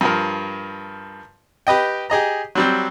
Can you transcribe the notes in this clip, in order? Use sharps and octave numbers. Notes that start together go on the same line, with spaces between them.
G2 F3 A#4
G4 B4 D#5 G5
G4 G#4 D#5 A#5
F#3 G3 C4